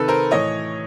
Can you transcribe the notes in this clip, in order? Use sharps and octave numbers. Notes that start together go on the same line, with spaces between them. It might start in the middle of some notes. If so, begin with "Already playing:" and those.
Already playing: C3 D#3 A4 B4
A#4 C5
A2 E3 C#5 D#5